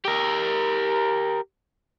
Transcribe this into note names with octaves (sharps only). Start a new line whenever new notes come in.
G4 A#4